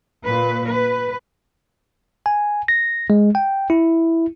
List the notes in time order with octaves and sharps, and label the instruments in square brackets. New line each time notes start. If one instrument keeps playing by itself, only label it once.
[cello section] A#2 B4
B4
[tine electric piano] G#5
A#6
G#3
G5
E4